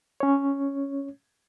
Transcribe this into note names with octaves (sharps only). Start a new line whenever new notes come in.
C#4 C#5